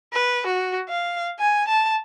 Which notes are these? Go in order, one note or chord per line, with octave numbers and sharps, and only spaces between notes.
B4
F#4
F5
G#5
A5